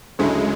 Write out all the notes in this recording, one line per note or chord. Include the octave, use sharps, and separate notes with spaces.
D2 C#3 F#3 G#3 A3 E4